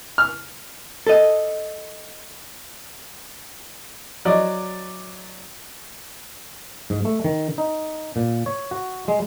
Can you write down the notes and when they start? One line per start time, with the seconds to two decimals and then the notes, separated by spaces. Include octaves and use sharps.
0.18 F6
1.07 A4 D#5
4.25 F#3 D5 D#5
6.90 G#2
7.05 A3
7.24 D#3
7.58 D#4
8.16 A#2
8.46 C#5
8.71 F#4
9.08 G#3